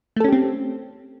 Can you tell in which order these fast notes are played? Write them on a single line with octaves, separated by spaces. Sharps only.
A3 A4 C#4 G4 C4